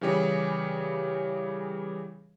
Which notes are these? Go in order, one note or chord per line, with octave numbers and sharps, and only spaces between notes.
C#3 E3 G3 G4 G#4 C#5